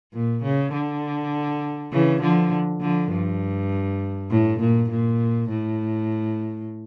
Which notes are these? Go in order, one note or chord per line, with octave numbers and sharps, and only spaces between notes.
A#2
C#3
D3
C#3 E3
D3 F3
D3 F3
G2
A2
A#2
A#2
A2